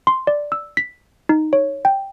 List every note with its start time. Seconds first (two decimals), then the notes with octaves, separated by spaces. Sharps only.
0.07 C6
0.27 D5
0.52 E6
0.77 B6
1.29 D#4
1.53 C#5
1.85 G5